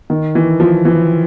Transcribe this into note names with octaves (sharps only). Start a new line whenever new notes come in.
D#3
E3
F3
E3